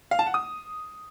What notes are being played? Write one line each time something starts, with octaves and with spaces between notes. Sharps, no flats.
F5
A5
F#5
D#6